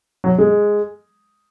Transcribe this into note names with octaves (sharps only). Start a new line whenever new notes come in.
F#3
G#3